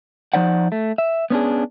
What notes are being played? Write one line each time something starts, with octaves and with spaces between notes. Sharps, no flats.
F3 D#4 C5 D5 F#5
A3
E5
B3 C#4 D4 G#4